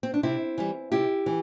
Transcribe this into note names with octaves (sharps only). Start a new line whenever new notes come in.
C4
D4
C3 C4 E4
E3 G3
C3 E4 G4
E3